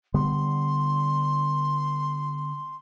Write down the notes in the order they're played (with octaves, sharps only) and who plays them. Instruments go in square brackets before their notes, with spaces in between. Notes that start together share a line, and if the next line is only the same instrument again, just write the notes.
[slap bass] D3 G3 B3 [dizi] C6